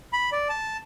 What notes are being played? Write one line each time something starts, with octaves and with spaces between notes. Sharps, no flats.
B5
D5
A5